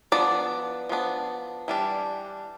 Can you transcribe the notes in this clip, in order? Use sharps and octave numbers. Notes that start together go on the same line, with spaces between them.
F3 B3 D4 D5
F3 B3 D4
E3 G3 D4